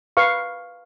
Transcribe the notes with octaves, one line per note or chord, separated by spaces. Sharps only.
B4 F5 C#6